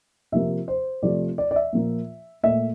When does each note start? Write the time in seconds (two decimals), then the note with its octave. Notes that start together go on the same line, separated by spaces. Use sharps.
0.32 C3 F3 A#3 E5
0.68 C5
1.02 C3 F3 A3 D5
1.38 D5
1.51 D5
1.56 E5
1.73 A#2 F3 A#3
2.43 A#2 A3 E5